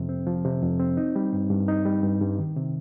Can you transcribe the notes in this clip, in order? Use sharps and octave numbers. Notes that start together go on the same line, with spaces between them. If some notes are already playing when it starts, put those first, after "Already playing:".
Already playing: F2 C3 F3
C4
F3
C3
F2
C4
D#4
G3
G2
G2
D#4
G3
G2
G2
D#3
C3